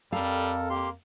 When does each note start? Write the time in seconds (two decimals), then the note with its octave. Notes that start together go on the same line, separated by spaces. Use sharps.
0.12 F2 G3 A4 A#4 F5
0.70 A#3 G4 C6